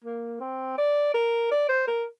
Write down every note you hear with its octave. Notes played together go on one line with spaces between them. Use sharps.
A#3
C4
D5
A#4
D5
C5
A#4